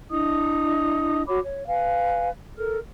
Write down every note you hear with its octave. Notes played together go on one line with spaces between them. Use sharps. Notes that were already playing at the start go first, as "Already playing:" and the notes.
D4 E4 D#5 D#6
F#4 C#5 B5 D6
C#5
B4 F5 G#5
A4 A#4 F6